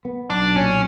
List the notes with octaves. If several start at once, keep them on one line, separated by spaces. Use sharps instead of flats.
B3
B1 D4
A#2 C#4